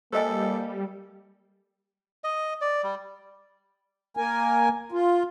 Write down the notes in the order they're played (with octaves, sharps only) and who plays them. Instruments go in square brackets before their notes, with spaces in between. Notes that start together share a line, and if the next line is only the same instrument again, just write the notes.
[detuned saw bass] G3 [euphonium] A#3 [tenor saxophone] A4 [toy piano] C5 D#5 G#5
[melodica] D#5
D5
G3
[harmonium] A#3 A#4 G#5
F4